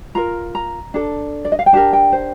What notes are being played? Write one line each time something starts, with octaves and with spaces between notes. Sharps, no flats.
F4 A#4 A#5
A#5
D4 A4
D5
D#5
F5
G5
D4 G4 A#4 A5
G5
C5